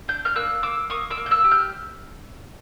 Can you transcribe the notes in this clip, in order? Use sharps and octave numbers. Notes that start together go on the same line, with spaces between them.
D4 G6
F6 G6
A#3 E6 F#6
A#3 D6 E6
A#3 C#6 D#6
D6 E6
A#3
G6
E6 F#6
G4
F6 G6